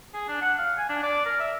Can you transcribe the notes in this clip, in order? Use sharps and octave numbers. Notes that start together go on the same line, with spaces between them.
G#4
D4
F#5
F5
G#5
D4
D5
A#4
E5